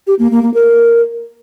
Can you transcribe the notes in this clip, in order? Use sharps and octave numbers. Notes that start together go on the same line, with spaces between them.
G4
A#3
A#3
A#3
A#4